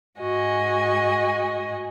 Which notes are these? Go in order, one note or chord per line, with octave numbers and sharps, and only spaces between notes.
G#2 F#4 D#5 G#5